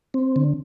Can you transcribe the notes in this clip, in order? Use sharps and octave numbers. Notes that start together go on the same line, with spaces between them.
C4
D3